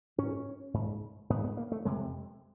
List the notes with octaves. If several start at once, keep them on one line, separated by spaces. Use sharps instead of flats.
G#2 C#4
G#2
G#2 B3
B3
A#3
A3
F2 C3 G#3